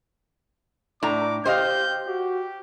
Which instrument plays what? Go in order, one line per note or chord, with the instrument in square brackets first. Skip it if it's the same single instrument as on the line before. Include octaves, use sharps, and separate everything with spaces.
[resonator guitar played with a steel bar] A2 A#5 [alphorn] D4 [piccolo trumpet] D6
[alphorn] G4 [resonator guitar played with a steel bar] C5 D#5 F5 [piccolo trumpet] G6
[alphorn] F#4 [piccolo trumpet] G4